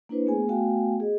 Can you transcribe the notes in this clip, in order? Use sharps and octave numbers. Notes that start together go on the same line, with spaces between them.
A#3 D4 E4 B4 C5
A3 B3 G#4 G#5
A3 B3 F#4 F5 G5 G#5
G#4 D#5